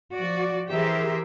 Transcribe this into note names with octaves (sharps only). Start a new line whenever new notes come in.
F3 F#4 D5
E3 G4 G#4 A#4 C5 E5